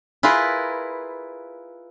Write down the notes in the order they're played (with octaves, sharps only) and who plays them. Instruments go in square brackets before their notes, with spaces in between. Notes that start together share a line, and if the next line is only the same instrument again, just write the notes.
[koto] E4 F4 G#4 A#4 B4